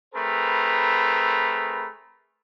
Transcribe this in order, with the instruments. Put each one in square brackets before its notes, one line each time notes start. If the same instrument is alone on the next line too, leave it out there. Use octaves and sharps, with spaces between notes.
[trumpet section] A3 C4 G#4 A#4 B4 B5